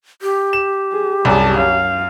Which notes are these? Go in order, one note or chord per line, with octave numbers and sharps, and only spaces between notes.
G4
E7
G#4
C2 F#2 G#4 A5
F#2 F5